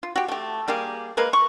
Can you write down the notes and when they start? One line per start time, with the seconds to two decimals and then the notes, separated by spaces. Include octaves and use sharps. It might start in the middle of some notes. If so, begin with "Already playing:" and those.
0.03 F4
0.16 F#4 G4
0.28 A3 G4
0.68 G3 A#3 G4 G#4
1.17 G#3 A#3 A#4 B4
1.33 C#6